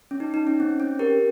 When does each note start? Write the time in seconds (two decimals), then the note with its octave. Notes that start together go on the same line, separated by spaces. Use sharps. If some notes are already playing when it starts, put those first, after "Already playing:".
0.11 C#4
0.20 D#4
0.34 D#4
0.47 C#4
0.60 C4
0.80 C#4
0.99 G4 A#4